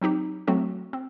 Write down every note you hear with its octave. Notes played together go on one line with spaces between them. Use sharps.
F#3 C4 D#4 G4
F#3 A3 C4 F#4 A4
C4